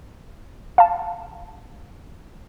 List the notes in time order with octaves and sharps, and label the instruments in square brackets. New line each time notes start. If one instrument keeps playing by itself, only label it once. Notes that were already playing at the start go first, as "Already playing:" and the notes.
[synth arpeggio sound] F5 A5